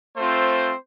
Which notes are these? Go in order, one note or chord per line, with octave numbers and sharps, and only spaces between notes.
A3 C4 F4 C5